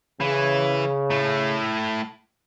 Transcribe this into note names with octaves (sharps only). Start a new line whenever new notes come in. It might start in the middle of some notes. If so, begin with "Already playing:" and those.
C#3 E3
A2 A3